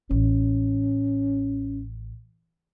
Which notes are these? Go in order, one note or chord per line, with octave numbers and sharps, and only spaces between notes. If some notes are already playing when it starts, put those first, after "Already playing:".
A1 C#4